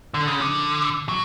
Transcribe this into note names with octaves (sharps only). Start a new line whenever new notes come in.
D3
C#3
D3
F#3